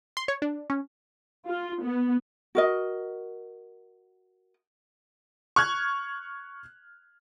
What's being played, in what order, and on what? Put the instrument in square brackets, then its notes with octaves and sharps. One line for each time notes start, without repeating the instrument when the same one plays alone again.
[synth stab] C6
C#5
D4
C#4
[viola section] F4
B3
[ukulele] F#4 A#4 D#5
[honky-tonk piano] C#6 F6 F#6 G#6